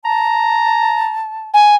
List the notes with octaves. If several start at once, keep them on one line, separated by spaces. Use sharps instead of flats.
A5 A#5
G#5